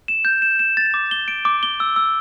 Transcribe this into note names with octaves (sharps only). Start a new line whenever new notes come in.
E7
G6
E7
E7
A6
D6
G7
D7
D6
G7
E6
E6